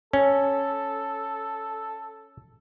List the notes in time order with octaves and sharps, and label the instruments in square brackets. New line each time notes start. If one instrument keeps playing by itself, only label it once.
[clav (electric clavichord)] C#4 [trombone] A4